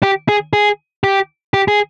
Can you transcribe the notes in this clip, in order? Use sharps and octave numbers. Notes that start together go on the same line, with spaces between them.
G4
G#4
G#4
G4
G4
G#4